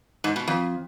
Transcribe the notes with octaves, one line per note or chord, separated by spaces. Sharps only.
G#2
B2
F2